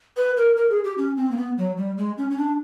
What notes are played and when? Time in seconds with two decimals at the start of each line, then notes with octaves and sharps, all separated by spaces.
0.17 B4
0.37 A#4
0.57 A#4
0.70 G#4
0.84 G4
0.98 C#4
1.17 C4
1.31 A#3
1.37 B3
1.58 F#3
1.77 G3
1.98 G#3
2.18 C#4
2.30 C#4
2.38 D4